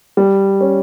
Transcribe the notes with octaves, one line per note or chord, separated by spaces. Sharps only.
G3
C#4